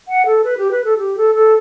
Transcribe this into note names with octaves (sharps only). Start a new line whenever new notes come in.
F#5
A4
B4
G4
B4
A4
G4
A4
A4